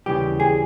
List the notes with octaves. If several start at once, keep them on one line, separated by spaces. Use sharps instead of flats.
D#2 C#3 E3 G3 G4
G#4